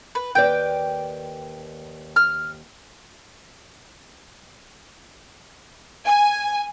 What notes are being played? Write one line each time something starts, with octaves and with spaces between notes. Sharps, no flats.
B4
D#2 B4 D5 G5
F6
G#5